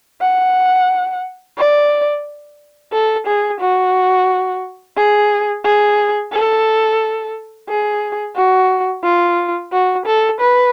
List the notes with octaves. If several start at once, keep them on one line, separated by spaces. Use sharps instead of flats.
F#5
D5
A4
G#4
F#4
G#4
G#4
A4
G#4
F#4
F4
F#4
A4
B4